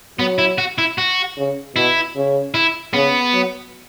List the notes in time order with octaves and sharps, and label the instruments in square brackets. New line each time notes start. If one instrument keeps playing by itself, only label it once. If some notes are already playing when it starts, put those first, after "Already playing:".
[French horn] F#3 [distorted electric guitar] B3
[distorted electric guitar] E4
F#4
E4
F#4
[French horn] C#3
[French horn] B2 [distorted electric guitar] E4
[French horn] C#3
[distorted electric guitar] E4
[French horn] C#3 [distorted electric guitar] B3
[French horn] F#3